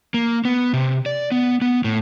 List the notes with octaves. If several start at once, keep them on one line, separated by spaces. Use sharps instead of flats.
A#3
B3
C3
D5
B3
B3
A2